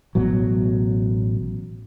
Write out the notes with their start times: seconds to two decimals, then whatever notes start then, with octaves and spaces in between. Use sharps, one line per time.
0.15 A1 B2 F#3